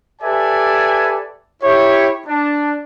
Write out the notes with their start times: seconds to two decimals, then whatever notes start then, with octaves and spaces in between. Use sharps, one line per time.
0.22 G4 A4 B4 D5 E5 G#5
1.62 E4 G4 C#5
2.26 D4